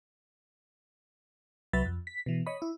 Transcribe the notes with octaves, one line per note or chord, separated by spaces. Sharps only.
C2 F#3 B4 E5 B5 A6
F2
B6
B2 E3
C#5 D#5 B5
E4